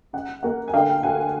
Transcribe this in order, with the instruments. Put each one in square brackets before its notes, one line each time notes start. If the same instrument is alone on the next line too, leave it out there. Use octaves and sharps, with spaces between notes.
[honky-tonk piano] C#3 F#5
A#3 F#5
G#5
D3 F5 G5
D2 F#5 G#5